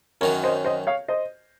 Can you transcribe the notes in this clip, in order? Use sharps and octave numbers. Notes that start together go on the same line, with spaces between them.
F#2 D#3 F#3 A#4 C#5
C5 D#5
C5 D#5
C#5 F5
C5 D#5